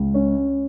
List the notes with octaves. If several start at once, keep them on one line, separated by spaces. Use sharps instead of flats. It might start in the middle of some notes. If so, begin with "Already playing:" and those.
Already playing: C#2
C#4